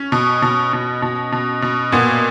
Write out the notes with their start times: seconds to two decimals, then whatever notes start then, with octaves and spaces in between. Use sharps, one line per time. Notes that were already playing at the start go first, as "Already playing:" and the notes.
Already playing: C#4
0.12 B2
0.42 B2
0.73 B2
1.02 B2
1.32 B2
1.62 B2
1.92 A#2 B3